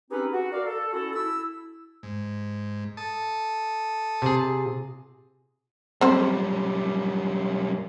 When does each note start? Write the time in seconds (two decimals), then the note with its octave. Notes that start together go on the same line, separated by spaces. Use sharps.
0.10 C4 C#4 D#4 G4 G#4 B4
0.31 F#4
0.52 A#4 D5 F5
0.65 A4
0.93 C#4 E4 F#4 A4
1.14 E4 E6
2.03 G#2
2.97 A4 A5 D#6
4.22 C3 G#4
6.01 F#2 G3 C4 C5